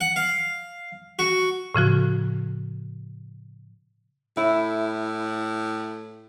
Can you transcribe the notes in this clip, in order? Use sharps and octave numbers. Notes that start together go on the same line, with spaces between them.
F#5
F5
F#4
A2 C#3 F3 F#4
A2 E4